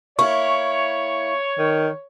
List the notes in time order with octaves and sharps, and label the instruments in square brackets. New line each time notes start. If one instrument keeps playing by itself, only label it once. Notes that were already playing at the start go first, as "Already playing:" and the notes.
[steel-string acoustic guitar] A#3 E4 [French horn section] C#5 [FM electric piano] C#6
[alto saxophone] D#3